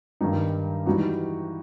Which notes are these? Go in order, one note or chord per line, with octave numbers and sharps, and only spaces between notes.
G2 D#3 G3 D#4
E3 G3 D#4 F#4